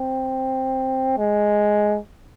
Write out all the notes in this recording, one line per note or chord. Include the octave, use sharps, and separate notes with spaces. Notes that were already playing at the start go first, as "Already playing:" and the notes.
Already playing: C4
G#3